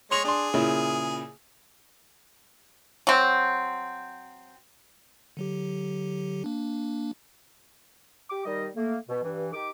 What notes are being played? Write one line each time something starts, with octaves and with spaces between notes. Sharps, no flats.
G#3 C#5 C6 F7
D4 G#4 C6
A#2 C#3 E4
F#3 C4
D3 F#3 G4
A#3 D4
G4 D6
D#3 G3 D#5
A3 A#3
B2
G2 E3
D#3 G4 D6